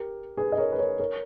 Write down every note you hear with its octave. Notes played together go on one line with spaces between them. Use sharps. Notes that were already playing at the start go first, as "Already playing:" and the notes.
Already playing: G4 A#4
G#4 B4
D#5
A#4 C#5
B4
A#4 C#5
A#4 C#5